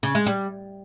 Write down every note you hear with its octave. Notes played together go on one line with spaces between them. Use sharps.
C#3
G#3
G3